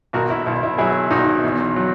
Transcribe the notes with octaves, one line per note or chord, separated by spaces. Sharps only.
B1 F#4 A#4
E4
B1 E4
E4
F#3 E4 G#4
B1 D#4 F#4
E2
F#3